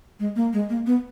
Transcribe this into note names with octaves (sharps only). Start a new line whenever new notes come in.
G#3
A#3
G#3
A#3
B3